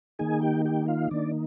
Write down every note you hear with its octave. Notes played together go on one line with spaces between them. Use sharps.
D#3 A#3 D#4 G#4 G#5
G4 G5
G4 G5
F4 F5
D#3 A#3 D4 D#4 D5